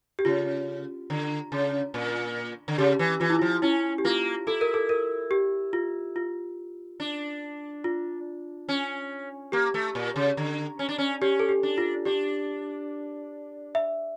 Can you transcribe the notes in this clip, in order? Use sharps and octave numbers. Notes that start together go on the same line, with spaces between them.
G4
C#3 F4
D3
C#3
A#2
D3
C#3 G4
E3
E3 F4
E4
F3 F4
C#4 E4
G4
A#3 F4
E4 A4
A#4
A4
A#4
G4
F4
F4
D4
F4
C#4
A#3 G4
A3
A#2
C#3
D3
C#4
D4
C#4
C#4 G4
A4
G4
D4
F4
D4 G4
E5